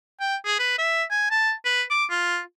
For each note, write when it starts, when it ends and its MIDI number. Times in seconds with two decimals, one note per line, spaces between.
0.20 0.36 79
0.45 0.55 68
0.59 0.77 71
0.78 1.03 76
1.10 1.28 80
1.31 1.52 81
1.65 1.82 71
1.90 2.05 86
2.10 2.41 65